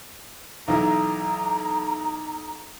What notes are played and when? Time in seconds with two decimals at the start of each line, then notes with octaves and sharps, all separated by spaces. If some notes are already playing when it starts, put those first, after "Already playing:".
0.68 B1 E3 A#5